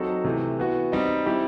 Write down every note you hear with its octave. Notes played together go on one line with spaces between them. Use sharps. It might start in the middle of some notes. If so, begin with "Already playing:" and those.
Already playing: F#3 C4 D#4 F#4 A4
C3 E3 A3
E3 B3 F#4
G3 C4 D#4
G3 C4 E4 G4